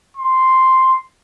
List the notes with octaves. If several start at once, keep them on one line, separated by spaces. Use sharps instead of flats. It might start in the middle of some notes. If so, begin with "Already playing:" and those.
C6